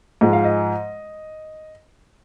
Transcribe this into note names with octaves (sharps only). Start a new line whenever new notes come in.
G#2 F3 G#3 D#5
F5
D#5